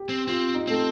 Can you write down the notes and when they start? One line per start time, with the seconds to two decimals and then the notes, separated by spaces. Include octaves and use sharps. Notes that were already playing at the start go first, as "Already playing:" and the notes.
Already playing: G4
0.09 C4
0.28 C4 F4
0.54 D#4
0.67 A3 C4